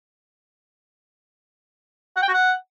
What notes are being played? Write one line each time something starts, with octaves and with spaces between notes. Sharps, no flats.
F#5
G5
F#4
F#5